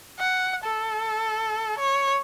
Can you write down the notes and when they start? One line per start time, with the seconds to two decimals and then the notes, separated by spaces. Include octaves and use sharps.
0.20 F#5
0.64 A4
1.79 C#5